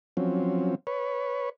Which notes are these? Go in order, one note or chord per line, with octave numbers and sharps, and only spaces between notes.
F3 F#3 C4 C#4
B4 C#5